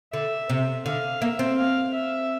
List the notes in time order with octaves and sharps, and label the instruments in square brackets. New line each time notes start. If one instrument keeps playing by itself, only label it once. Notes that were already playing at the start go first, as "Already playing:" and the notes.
[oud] D3 [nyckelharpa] E5
[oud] C3
[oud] D3 [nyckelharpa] F5
[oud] A#3 [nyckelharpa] E5
[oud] C4
[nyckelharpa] F5
E5